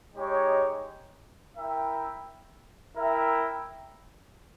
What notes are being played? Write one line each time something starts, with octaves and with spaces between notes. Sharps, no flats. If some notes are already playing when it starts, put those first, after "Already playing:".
G#3 D#4 G4 C#5
E4 A#4 E5 G5
E4 A#4 E5 G5